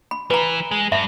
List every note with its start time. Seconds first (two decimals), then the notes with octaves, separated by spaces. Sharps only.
0.11 B5
0.31 E3 B4 A#5
0.71 G#3
0.92 G2 E5